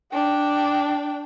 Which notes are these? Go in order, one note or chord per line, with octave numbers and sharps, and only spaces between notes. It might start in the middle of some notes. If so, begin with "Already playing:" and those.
D4 G5